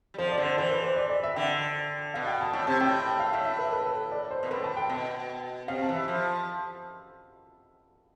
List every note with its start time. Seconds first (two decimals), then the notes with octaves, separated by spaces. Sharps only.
0.14 G3
0.18 F3 C5
0.32 D5
0.38 D3
0.44 C5
0.58 E3 C5
0.71 B4
0.83 C5
0.96 D5
1.10 D5
1.23 E5
1.35 D3 G5
2.14 B2 F5
2.28 G5
2.41 A5
2.53 A2 A5
2.67 C3 A5
2.80 A2 G5
3.06 G5
3.20 F5
3.33 A2 E5
3.45 E5
3.58 B4
3.73 B4
3.86 A4
4.12 D5
4.31 C5
4.43 B2
4.51 A2 B4
4.64 A5
4.77 G5
4.90 B2
5.68 C3 F5
5.82 A5
5.89 E3
5.95 E5
6.08 F3